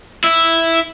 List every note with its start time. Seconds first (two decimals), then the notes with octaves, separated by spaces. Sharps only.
0.24 E4